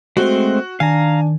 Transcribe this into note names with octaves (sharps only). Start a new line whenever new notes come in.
G#3 A3 C4 F#4 C5
D#3 D4 F5 G#5 A#5